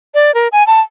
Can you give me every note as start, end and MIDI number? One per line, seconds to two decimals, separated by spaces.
0.14 0.34 74
0.35 0.48 70
0.52 0.66 80
0.67 0.80 81